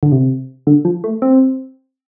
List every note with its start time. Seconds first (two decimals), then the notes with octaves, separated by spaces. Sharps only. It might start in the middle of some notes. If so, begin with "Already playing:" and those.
0.03 D3
0.12 C3
0.67 D3
0.85 F3
1.04 A3
1.22 C4